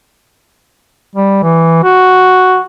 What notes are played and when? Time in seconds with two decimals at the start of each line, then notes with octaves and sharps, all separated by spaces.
1.16 G3
1.43 E3
1.84 F#4